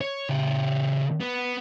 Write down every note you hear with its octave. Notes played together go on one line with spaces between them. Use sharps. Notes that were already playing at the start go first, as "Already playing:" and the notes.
C#5
C#3 G4
B3